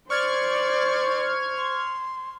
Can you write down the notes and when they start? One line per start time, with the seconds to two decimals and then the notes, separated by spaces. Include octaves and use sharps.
0.10 C5 D5 C#6 F6 G#6
1.56 C6